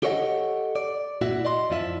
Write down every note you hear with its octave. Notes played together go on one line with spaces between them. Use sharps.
G4 A4 C#5 D#5 F5 F#5
D5
A#2 E4 F#4 E5
D5 D#5 C6
F2 F3 E4 E5